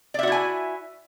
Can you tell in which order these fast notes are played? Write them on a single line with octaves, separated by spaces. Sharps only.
D5 E5 F#4 E4 G#5